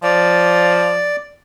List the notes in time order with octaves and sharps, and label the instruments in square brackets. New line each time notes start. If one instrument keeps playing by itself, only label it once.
[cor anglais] F3 [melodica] D5